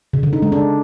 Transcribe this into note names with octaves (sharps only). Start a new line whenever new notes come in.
C#3
D3
D#4
G#3
D4